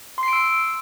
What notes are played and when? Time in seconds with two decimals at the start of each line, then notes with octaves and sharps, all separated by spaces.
0.18 C6
0.23 C7
0.28 D7
0.33 E6